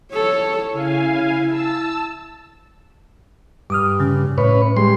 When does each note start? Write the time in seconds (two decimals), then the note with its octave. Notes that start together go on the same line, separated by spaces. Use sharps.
0.12 A4 C#5
0.72 C#3 E4 F5 G#5
1.48 A5 E6
3.70 G2 D6 D#6 F6
4.00 C#3 C#4
4.38 A2 B4 C#5
4.77 G3 G#3 C6